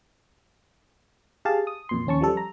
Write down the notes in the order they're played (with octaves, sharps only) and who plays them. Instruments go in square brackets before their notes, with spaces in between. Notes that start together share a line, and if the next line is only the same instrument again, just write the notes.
[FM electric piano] G4 G#4 F5 A5
D#6
F2 A#2 C6
D#2 C#4 A5 C#6
F3 G3 A4
A#5